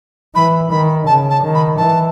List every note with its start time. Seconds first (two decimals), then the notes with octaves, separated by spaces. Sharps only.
0.35 E3 B5
0.71 D#3 B5
1.06 C#3 A5
1.30 A5
1.42 D#3
1.54 B5
1.77 E3 A5